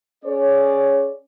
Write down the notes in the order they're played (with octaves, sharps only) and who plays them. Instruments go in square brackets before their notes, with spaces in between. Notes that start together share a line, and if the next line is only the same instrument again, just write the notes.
[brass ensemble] C#4 G#4 C#5 D5